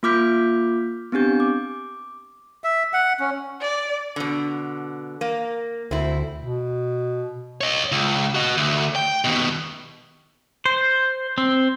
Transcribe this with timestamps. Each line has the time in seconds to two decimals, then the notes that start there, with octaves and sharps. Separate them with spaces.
0.03 A#3 F4 D6 F6 G6 B6
1.12 B3 C4 D4 G4 G6
1.40 D6
2.64 E5
2.93 F#5
3.20 C#4
3.61 D5
4.16 B2 D3
5.21 A#3
5.91 D2 C4 E4
6.38 B2
7.61 C#5 D#5
7.92 C#2
8.35 F#4 D#5
8.57 D2
8.96 G5
9.24 D#2 B2
10.66 C5
11.38 C4